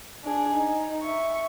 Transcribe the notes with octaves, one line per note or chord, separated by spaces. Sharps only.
D4 G#4
D#4
E5 C#6